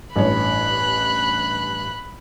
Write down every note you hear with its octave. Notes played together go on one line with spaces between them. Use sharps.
A1 G2 C#5 B5 F#6